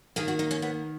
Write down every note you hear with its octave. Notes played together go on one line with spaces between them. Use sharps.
D#3 A#3 G#4
F#4
D#4
C#4
B3